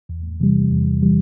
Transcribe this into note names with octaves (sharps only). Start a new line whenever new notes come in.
E2
C3 E3 G3
E2
E3 G3